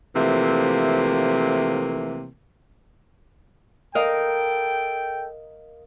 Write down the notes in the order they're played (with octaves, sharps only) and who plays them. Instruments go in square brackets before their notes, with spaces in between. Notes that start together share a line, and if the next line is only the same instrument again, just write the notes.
[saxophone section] C3 E3 F3 A3 A#3
[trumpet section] A4 G5 [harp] A#4 D#5 F5